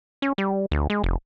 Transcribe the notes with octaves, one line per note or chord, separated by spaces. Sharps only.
C#4
G3
D2
G#3
F1